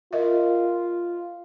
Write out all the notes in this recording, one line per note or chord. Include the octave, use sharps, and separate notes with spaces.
F4 A#4 D#5 E5